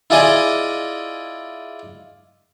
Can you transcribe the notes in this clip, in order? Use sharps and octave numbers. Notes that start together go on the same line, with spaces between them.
E4 F4 G#4 D5 D#5 G#5